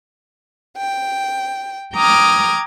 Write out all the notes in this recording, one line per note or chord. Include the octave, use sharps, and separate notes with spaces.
G5
G5 A#5 D6 D#6 F6 G#6